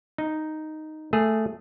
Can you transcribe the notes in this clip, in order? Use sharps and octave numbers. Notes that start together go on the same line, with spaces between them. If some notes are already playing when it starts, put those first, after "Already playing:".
D#4
A3 G#4